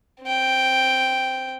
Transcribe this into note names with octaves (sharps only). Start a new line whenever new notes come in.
C4 G5